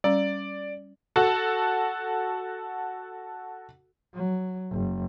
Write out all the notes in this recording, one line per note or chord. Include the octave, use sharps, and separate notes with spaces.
G3 C#4 D5
F#4 A4
F#3
F#1